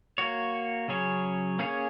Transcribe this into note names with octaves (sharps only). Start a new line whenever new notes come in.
A#3 F#4 C#5
C#3 F#3 C#4 G#4 C#5
A#3 C#4 G#4 C#5